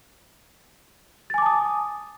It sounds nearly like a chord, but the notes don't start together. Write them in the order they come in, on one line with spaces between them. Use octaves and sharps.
A6 G#5 D6 A5 D#6